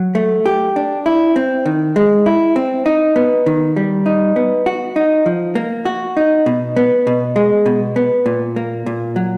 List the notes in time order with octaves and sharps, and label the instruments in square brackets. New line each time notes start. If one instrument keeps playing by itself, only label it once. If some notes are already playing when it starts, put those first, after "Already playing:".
Already playing: [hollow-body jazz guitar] F#3
A3
G4
D4
E4
C4
D#3
G#3
E4
C4
D#4
B3
D#3
G3
D#4
B3
F#4
D#4
F3
A#3
F#4
D#4
B2
B3
B2
G#3
B2
B3
A#2
A#3
A#2
F#3